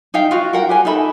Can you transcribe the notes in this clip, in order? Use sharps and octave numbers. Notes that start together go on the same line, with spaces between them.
D#4 E5 F5 G5
F4 F#4 F5
A#4 F#5 G5
G4 B4 G#5
D#4 A4 E5 B5